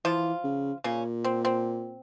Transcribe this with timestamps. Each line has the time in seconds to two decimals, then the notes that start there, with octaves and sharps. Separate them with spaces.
0.04 E3 F3 F4
0.44 C#3
0.84 A#2 C#3 C#4
1.24 C4
1.45 C4